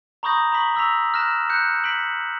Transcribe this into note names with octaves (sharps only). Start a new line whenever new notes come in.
A#5 B5 C#6 D#6 G6 A#6
A#5 B5 C#6 B6 F#7
C#6 E6 A#6 B6 F7
F6 F#6 A#6 E7
F#6 G6 C#7
B6 D7 F#7